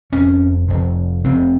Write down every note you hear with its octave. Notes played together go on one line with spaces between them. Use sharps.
F1 F2 C3 C#4
F1 F2 C3
F1 F2 C3 C4